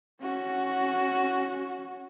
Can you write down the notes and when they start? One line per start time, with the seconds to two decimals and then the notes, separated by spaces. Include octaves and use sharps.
0.22 C#4 F#4